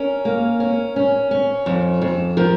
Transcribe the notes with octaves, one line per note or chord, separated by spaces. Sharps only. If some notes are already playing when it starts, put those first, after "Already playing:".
Already playing: C#4 A#4
A#3
C#4
C#4
C#4
F2
F2
F3 A#4